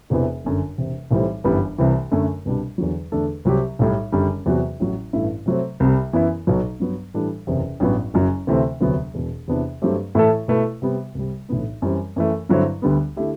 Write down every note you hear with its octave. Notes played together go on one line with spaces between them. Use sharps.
E1 E2 C3 E3 B3
G1 F#2 D3
E1 E2 C3
B1 A2 E3 G3 C4
G1 F#2 E3 G3 B3
C2 C3 E3
F#2 D3 A3
C2 B2 G3 D4
E2 D3 F#3
E2 D3 A3 D4 A4
C2 C3 F#3 C4 G4
B1 A2 G3
F#1 F#2 D3 G3
E2 C3 F#3 B3 F#4
A1 A2 F#3
A1 G2 E3 A3 E4
C3 F#3 A3 C4
C2 C3 G3
F#2 E3 B3 E4
B1 B2 F#3
G2 F#3 B3
A2 E3 G3 D4 A4
F#1 E2 C3
A1 G2 F#3 B3
F#1 F#2 F#3
D2 C3 E3 A3 C4
E1 D2 C3 F#3 B3
E1 E2 B2
E2 C3 E3 B3 D4
G2 F#3 A3 C4 G4
A2 E3 A3 E4 A4
B2 A3 E4 B4
C3 G3 B3
C2 C3 G3
B1 A2 E3 B3 D4
F#2 E3 G3 C4
F#2 E3 A3
G2 D3 F#3 C4 E4
D2 D3 G3 B3
D3 A3 E4 G4